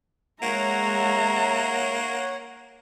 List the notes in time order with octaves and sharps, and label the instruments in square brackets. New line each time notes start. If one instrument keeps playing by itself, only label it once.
[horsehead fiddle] G#3 E5 [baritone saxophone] A#3 [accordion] C#5 F#5 [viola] A#5